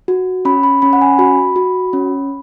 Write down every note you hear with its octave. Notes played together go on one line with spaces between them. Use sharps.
F#4
C#4 B5
B5
C#4 B5
F#5
G#5
F#4 B5
F#4
C#4